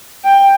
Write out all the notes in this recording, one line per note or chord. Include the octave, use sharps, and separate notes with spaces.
G5